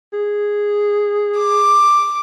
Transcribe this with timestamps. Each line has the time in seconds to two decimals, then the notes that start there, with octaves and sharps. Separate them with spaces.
0.13 G#4
1.38 D6